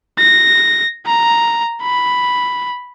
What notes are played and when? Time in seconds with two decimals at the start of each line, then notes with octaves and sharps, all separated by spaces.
0.18 A#6
1.06 A#5
1.82 B5